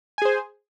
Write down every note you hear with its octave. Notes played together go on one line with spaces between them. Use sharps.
G#4 C5 G#5